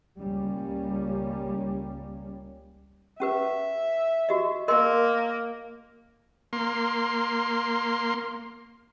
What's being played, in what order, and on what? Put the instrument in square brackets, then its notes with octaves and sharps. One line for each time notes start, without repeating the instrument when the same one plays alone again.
[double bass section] C#2 G3 A#3 C#4
[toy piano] C#4 G4 B4 [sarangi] E5
[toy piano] F#4 G4 D#5
[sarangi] A#3 [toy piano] A#4 D#5 C6
[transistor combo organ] A#3 C6